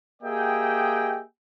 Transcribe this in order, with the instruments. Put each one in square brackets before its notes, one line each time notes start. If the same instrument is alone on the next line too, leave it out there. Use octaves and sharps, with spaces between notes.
[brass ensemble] A#3 G4 G#4 D#5 E5 G5